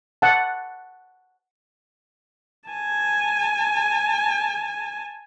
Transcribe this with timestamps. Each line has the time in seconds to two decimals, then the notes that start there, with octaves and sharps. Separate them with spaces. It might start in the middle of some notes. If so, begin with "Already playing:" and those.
0.22 F#5 A5
2.69 G#5 A5